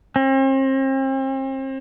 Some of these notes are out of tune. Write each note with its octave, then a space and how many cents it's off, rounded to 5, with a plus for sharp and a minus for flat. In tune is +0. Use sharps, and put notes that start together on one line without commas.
C4 +40